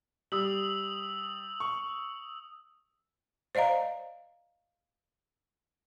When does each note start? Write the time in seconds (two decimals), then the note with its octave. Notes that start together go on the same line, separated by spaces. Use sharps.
0.32 G3 D#6 E6 F#7
1.60 C#6
3.55 C5 D5 D#5 F5 A#5